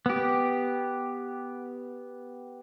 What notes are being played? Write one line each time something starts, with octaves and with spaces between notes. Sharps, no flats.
B3 G4